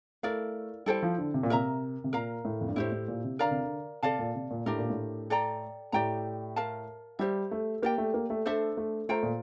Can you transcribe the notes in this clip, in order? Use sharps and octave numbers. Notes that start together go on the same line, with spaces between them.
A3 E4 A#4 D5 F5
G3 E4 A4 C5 G5
F3
D3
C3
A#2
C3 A#4 E5 A#5
C3
A#2 A#4 F5 A#5
A2
F2
G2
A2 E4 G4 C5
A2
A#2
C3
D3 A#4 D5 F5 A#5
C3
D3
C3 A4 D5 F5 A5
A#2
C3
A#2
A2 D4 G4 A#4
A#2
A2
A4 D5 G5 A#5
A2 G4 D5 G5 A#5
A#4 F5 A5
G3 G4 C5 E5
A3
A#3 G4 D5 G5
A3
A#3
A3
A3 D4 A4 C5 E5
A3
A3 F4 C5 G5 A#5
A#2